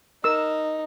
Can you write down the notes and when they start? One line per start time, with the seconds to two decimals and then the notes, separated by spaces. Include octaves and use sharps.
0.24 D#4 A#4 E6